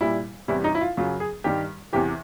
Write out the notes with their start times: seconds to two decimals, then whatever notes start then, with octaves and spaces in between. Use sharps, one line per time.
0.01 A#2 G3 E4
0.48 E2 C3 E3 G3 E4
0.64 D#4
0.75 E4
0.81 F4
0.97 F#2 C#3 F#3 F4
1.20 G#4
1.44 G2 D#3 G3 G4
1.93 E2 C3 E3 G4